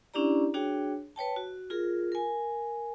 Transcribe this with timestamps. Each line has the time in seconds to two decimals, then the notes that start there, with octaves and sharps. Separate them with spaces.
0.14 C#4 D4 E4 G4 D5 A#5
0.54 D4 F#4 G#4 C#5 G5
1.16 B4 C#5 G5 A5
1.36 F#4
1.70 F4 G#4 A#4
2.12 A#4 G#5